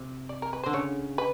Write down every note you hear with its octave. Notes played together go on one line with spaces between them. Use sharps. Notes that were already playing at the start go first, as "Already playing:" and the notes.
Already playing: C3
D5
A#4
B4
D3 C5
C#3 C#5
B4